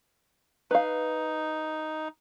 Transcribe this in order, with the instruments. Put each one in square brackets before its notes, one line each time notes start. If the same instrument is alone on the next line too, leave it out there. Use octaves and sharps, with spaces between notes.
[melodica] D#4 [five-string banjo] B4 F5